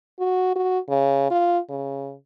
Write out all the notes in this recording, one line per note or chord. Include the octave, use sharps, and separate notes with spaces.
F#4
F#4
C#3
F4
C#3